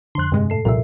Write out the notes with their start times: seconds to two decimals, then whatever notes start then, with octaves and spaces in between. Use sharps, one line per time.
0.15 F2 D3 C6 F#6
0.32 G2 C3 G#3
0.50 A2 A4 C7
0.65 C2 F2 A#2 A#4 E5